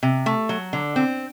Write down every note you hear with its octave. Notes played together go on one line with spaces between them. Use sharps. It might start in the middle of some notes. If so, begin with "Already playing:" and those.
C3
A3
F#3
D3
C4